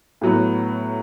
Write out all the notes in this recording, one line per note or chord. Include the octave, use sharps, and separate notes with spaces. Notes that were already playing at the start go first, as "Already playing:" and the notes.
A2 F#3 B3